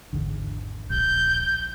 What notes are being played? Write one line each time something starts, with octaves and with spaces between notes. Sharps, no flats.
G#1 E2 D3
D1 A#1 G6